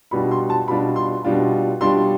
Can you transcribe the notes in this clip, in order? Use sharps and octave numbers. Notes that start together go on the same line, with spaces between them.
B2 G3 D4 F4 B5
C6
A5
B2 G3 D4 F4 B5
C6
B2 G3 D4 F4
B2 G3 D4 F4 C6